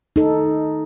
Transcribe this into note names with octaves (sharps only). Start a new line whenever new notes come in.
D#4 A4